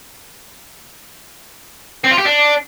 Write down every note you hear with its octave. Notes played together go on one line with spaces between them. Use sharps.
C4
F4
G4
D4